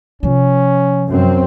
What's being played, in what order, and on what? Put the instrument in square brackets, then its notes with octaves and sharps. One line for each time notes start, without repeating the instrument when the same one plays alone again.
[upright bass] C3 F3 [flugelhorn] C#4
[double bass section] F#2 C4